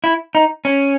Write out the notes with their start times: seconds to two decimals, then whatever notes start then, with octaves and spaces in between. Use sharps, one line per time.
0.04 E4
0.35 D#4
0.65 C#4